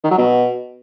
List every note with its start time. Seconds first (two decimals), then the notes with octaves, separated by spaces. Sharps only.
0.04 D#3
0.11 F#3
0.18 B2